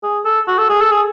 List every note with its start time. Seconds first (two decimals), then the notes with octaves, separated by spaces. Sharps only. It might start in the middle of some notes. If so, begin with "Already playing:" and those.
0.03 G#4
0.25 A4
0.47 F#4
0.58 A4
0.70 G#4
0.81 A4
0.91 G#4